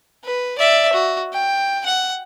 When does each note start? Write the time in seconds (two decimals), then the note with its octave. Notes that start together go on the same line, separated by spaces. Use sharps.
0.25 B4
0.58 D5 E5
0.93 F#4
1.33 G5
1.85 F#5